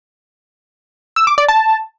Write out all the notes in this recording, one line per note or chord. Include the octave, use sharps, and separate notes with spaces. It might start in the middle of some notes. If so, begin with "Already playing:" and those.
E6
D6
D5
A5